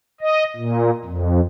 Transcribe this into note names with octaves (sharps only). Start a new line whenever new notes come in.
D#5
A#2
F2